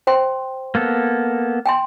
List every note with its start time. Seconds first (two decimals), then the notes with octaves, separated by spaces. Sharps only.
0.07 C5 G5 C6
0.75 A#3 B3 A4
1.66 G5 G#5 C6